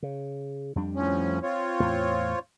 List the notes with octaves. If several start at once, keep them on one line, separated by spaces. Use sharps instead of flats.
C#3
F2 G3 D4
A2 F3 C#4
C4 F4 C#5
E2 A2